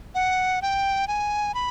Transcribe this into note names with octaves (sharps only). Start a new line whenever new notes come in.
F#5
G5
G#5
B5